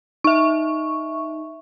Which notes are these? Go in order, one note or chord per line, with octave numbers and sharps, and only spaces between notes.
D#4 E5 C#6